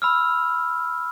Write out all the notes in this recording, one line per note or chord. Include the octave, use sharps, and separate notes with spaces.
B5 E6 F6